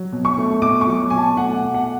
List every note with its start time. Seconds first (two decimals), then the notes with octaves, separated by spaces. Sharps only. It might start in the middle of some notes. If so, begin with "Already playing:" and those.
Already playing: F#3
0.13 B2
0.25 C#6
0.38 A3
0.62 B2 D6
0.81 C#6
0.87 F#3
1.10 B2 G#5
1.18 A5
1.37 A3 F#5
1.62 B2
1.74 F#5